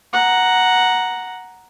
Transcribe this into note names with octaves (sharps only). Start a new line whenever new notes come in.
F#5 A#5